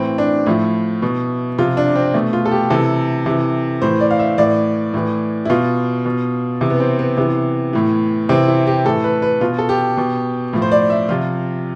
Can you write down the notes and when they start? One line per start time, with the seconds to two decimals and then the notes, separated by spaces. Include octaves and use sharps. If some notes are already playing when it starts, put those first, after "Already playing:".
Already playing: A2 E3 C4
0.18 D4
0.46 A2 F3 E4
1.02 B2
1.58 C3 F3 F4
1.77 D4
1.96 C4
2.14 B2 A3
2.33 F4
2.45 A4
2.51 G4
2.70 C3 E3 A4
3.26 C3 E3
3.82 A2 E3 C5
4.00 D5
4.11 F5
4.19 E5
4.38 A2 E3 D5
4.94 A2 E3
5.45 E4
5.50 B2 F4
6.06 B2
6.61 C3 E3
6.70 B3
6.80 C4
6.99 B3
7.17 C3 E3 B3
7.73 A2 E3
8.29 C3 E3 C4
8.48 E4
8.67 G4
8.85 A2 E3 A4
9.04 B4
9.22 B4
9.41 B2 F4
9.59 A4
9.69 G4
9.97 B2
10.53 A2 F3
10.62 C5
10.72 D5
10.90 E5
11.09 C3 F3 F4